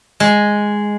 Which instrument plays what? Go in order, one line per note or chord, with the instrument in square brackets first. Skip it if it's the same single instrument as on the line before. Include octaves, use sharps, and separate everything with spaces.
[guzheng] G#3